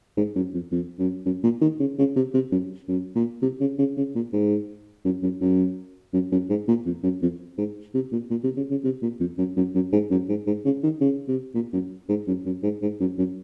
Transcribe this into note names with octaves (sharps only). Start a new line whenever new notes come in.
G#2
F#2
F2
F2
F#2
F#2
A#2
D#3
C#3
C#3
C3
C3
F#2
F#2
A#2
C3
C#3
C#3
C#3
A#2
G#2
F#2
F#2
F#2
F#2
F#2
G#2
A#2
F2
F#2
F2
G#2
C3
A#2
A#2
C3
C#3
C#3
C3
A#2
F2
F#2
F#2
F#2
G#2
F#2
G#2
G#2
C#3
D#3
C#3
C3
A#2
F#2
G#2
F#2
F#2
G#2
G#2
F#2
F#2